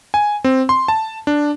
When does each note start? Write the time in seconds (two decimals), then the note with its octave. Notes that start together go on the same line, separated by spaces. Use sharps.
0.14 G#5
0.44 C4
0.69 C6
0.88 A5
1.27 D4